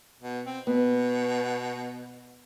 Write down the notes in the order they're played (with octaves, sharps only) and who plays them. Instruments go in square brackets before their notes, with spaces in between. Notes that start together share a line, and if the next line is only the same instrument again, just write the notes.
[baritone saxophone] B2
C4
[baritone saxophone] B2 [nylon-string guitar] B3